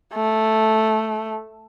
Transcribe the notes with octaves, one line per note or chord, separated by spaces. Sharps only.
A3